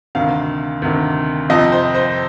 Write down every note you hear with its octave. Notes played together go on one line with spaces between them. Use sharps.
D2 C3 D#3 F5
D2 C3 D#3
F2 C3 F3 D#5
C5
C5